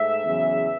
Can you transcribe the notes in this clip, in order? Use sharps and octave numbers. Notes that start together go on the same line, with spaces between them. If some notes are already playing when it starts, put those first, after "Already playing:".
Already playing: G#2 A3 E5
E2 C#3 F#3